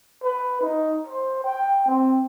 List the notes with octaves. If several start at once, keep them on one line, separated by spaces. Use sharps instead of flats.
B4
D#4
C5
G5
C4